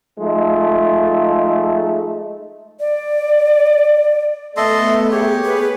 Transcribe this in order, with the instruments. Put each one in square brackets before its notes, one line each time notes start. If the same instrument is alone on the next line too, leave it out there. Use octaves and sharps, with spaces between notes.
[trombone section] F3 G#3 A3 D#4
[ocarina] D5
[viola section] A3 B3 [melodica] A4 D#5 C6 [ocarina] E5
[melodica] G4 C#5 [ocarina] G#4
[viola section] B3 B4 [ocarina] G#4